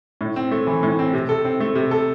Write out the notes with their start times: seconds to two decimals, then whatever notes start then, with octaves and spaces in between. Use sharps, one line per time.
0.21 A2
0.36 C4
0.52 A3
0.67 E3
0.83 A2
0.99 C4
1.13 C3
1.29 A4
1.45 C4
1.60 A3
1.75 C3
1.91 A4